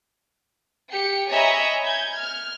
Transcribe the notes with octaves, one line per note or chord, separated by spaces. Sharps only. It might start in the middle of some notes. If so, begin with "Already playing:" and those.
G4 C#7
C#5 D#5 E5 G#5 A#5 B5
G6 G#6
F6